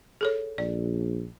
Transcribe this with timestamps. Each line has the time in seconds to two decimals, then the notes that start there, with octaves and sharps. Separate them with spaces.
0.21 G#4 A4 C#5
0.58 A#1 D5